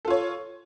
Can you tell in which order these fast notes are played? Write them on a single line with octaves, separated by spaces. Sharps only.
A4 F4 C#5